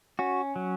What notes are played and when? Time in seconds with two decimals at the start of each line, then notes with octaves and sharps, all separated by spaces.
0.19 C#4 F#4
0.56 F#3